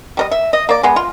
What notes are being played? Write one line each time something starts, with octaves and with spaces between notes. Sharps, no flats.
G3 A#4 D#5
E5
D#5
A#3 D5
G#3 B3
F4